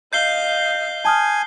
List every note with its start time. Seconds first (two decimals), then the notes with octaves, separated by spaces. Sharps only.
0.13 D#5 F5 G6 C7 G7
1.05 G#5 A5 D#6 F6